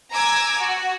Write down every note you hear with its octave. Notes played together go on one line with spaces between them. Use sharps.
G#5 A#5 D6 E6 G#6
F#4